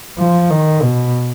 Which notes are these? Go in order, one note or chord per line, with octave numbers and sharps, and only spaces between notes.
F3
D#3
B2